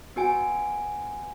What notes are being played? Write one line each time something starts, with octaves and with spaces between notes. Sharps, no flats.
B3 F#4 G#5 D7